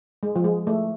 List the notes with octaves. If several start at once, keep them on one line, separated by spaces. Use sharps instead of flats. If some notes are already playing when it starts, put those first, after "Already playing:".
G#3
F3
G#3
A3